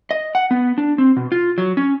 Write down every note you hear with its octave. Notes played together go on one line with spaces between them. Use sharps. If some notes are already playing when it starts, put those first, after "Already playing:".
D#5
F#5
B3
D4
C4
B2
F4
F#3
C#4